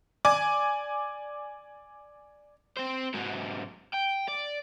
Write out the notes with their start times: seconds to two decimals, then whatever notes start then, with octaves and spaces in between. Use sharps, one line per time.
0.25 D5 G#5 D6
2.77 C4 C5
3.14 G#2 F#3
3.94 G5
4.28 D5